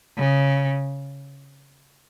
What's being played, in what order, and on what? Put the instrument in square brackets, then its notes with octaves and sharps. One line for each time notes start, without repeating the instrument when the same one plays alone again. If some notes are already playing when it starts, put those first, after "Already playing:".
[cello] C#3